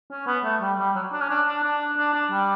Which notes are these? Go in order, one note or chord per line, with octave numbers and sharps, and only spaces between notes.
C#4
B3
A3
G3
G3
F#3
D4
C#4
D4
D4
D4
D4
D4
G3